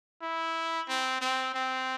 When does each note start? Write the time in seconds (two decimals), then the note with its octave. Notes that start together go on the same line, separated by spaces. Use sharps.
0.22 E4
0.89 C4
1.21 C4
1.55 C4